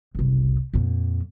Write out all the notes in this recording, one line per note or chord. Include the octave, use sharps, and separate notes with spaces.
F#1 C2
F2 A#2